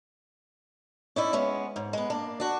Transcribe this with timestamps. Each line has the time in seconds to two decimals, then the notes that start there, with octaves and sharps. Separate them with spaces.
1.16 C#4 D#4 E4 D5
1.33 G#3 B3 C#4
1.76 G#2
1.93 G#3 B3
2.10 A#3 D4
2.40 D4 F#4